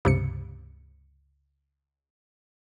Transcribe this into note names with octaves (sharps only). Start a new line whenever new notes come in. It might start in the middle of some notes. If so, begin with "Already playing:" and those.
C#2 G2 C3 C#7